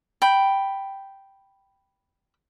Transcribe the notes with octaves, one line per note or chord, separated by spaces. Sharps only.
G5 B5